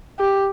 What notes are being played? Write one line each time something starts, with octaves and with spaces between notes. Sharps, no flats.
G4